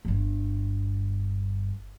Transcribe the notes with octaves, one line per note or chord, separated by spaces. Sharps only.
G1 G2